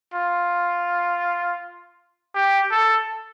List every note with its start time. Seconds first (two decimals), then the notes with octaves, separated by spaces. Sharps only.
0.14 F4
2.34 G4
2.71 A4